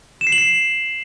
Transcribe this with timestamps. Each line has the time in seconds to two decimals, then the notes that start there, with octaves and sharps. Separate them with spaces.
0.21 E7
0.27 C7
0.32 F#7
0.38 C7